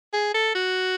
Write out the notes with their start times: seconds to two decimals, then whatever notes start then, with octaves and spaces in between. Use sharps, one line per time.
0.13 G#4
0.34 A4
0.55 F#4